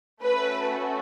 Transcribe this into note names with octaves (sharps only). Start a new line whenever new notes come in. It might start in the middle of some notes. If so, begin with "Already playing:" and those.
A3 C#4 F#4 A4 B4